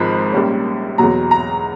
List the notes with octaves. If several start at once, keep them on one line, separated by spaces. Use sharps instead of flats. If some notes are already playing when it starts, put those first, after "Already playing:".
Already playing: G#1 G#2 F3 B5
A#1 A#2 G3 A#3 C#4
E2 B2 F#3 A#5
A#5